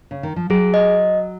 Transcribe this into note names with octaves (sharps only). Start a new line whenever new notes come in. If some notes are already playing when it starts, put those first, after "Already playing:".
C#3
D#3
F3
F#3 G#4
D#5